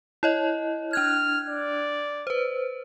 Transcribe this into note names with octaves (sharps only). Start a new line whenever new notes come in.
E4 C#5 D#5
D4 F6 F#6 G#6
D5
B4 C5